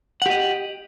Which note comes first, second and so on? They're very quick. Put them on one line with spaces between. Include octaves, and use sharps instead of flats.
F#5 G4 D#5